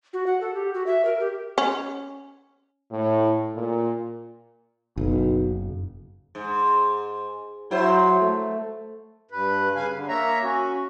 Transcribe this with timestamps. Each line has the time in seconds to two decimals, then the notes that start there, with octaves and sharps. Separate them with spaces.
0.13 F#4
0.26 F#5
0.41 A4
0.54 G4
0.74 F#4
0.86 E5
1.05 A#4
1.20 G4
1.58 C#4
2.91 A2
3.55 A#2
4.97 F#1 B1
6.35 G#2
7.71 F#3 E4 C5
8.21 A3
9.31 G2 B4
9.76 C#3 B4 F5 G#5
9.92 D3
10.09 A#3 C#5 E5 A#5
10.43 C#4 F#4